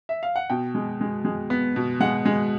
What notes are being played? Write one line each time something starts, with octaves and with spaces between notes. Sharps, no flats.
E5
F5
F#5
B2 G5
G#3
G#3
G#3
B3
B2
G#3 F#5
G#3